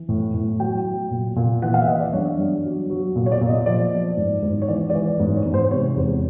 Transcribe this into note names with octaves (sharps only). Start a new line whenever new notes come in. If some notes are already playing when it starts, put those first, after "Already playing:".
Already playing: E3
A2
A2
F#3 G5
F#3
A#2
A#2
E3 F#5
F5
E5
E3 D#5
D5
G2 C#5
G2
F#3
F#3
A#2
C#5
D5
A#2
D#5
F3 D5
F3
G#2
G#2
C#5
E3 D5
D5
E3 C#5
G#2
C#5
G#2
C5
C3 C#5
E2